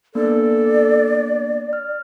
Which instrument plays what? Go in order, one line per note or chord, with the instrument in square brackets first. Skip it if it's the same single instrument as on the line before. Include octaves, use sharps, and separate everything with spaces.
[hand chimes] A#3 B3 D4 [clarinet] A4 [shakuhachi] D5
[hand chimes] F6